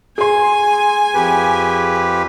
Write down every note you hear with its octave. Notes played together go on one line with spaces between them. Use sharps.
G#4 G#5 C6
F2 G4 B4